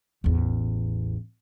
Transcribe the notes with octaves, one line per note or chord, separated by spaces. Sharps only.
A1 E2